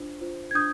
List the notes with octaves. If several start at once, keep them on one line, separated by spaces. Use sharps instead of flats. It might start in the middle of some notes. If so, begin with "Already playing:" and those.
Already playing: D4 F4 C5
F4 C5
G#6
D4 D#6 G6